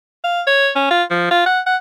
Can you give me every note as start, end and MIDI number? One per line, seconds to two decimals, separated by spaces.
0.24 0.42 77
0.47 0.69 73
0.75 0.87 61
0.90 1.03 65
1.10 1.26 53
1.31 1.44 65
1.46 1.60 78
1.66 1.76 78